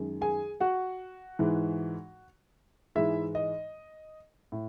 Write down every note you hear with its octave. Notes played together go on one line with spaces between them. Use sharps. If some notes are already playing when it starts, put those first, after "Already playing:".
Already playing: F#2 D#3 G#3
G#4 G#5
F#4 F#5
G#2 E3 G#3
G#2 E3 G#3 E4 E5
D#5
A2